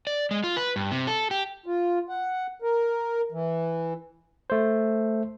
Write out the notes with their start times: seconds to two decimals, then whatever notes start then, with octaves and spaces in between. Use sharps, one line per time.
0.07 D5
0.31 G#3
0.44 F4
0.57 B4
0.76 G2
0.91 C3
1.07 A4
1.31 G4
1.66 F4
2.09 F#5
2.62 A#4
3.32 E3
4.50 A3 C5